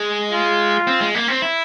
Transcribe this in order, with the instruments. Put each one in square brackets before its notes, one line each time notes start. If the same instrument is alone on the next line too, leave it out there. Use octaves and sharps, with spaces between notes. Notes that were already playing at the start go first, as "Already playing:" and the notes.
Already playing: [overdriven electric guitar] G#3
[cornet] F4
[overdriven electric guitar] C4
G#3
A#3
C4
E4